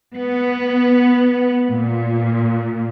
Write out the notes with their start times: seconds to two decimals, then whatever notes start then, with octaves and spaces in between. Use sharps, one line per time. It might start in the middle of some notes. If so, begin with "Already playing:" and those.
0.16 B3
1.70 A#2